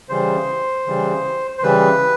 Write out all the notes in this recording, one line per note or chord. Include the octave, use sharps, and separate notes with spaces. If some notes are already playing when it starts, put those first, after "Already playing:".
C#3 E3 G3 C5
C#3 E3 G3
C5
C#3 E3 G3 B4